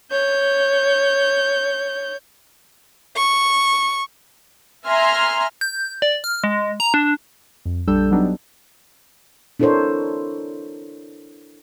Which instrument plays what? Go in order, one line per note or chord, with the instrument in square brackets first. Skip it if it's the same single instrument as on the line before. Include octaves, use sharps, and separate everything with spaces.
[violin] C#5 G6
C#6
[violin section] E5 G#5 A#5 C6 F6
[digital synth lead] G6
D5
F6
G#3
A#5
D4
[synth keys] F2
A#1 G3 D4 A4 E6 G6
F#3 B3 D4 D#4 G4
[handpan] D4 E4 A4 A#4 C5 C#5